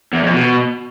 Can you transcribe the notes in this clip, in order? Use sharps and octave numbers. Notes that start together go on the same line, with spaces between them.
E2
F2
B2